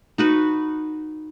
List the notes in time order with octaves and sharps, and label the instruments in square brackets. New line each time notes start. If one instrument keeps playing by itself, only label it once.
[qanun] D#4 F#4 B4